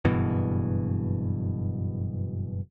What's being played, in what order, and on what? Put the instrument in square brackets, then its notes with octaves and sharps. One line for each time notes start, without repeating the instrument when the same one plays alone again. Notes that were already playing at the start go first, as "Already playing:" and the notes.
[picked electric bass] F#1 G2 B2 E3